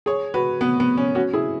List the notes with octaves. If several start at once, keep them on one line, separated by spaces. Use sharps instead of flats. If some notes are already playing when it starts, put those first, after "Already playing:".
G#4 C#5
F#4 B4
B3
B3
C#4
C#4 F#4
E4 G#4